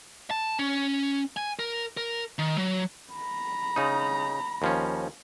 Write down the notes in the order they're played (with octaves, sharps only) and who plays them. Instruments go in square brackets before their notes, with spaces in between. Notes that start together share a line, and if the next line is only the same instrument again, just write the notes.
[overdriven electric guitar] A5
C#4
G#5
A#4
A#4
D#3
F#3
[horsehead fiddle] A#5 B5
[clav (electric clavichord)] C#3 D#4
D#2 F3 C#4